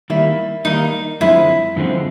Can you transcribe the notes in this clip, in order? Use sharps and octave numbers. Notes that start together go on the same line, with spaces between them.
D#3 G3 A#3 E4
D#3 G3 A#3 D#4
F#2 D3 F3 G#3 C4 E4
F#2 D3 F3 G#3 C4